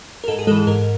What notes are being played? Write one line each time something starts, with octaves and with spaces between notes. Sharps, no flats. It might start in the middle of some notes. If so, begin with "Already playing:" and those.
A#4
G#2 A4
G#4
E3 G#3 A4
G#2 A#4